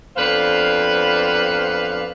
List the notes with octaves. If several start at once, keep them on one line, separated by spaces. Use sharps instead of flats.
F2 B3 D4 B4 C5 F5